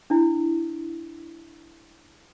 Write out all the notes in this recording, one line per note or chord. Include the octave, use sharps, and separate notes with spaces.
D4 E4